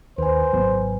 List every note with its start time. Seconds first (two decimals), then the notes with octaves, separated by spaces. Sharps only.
0.18 D#2 B4 C5 G#5
0.52 G#1 F#3 B3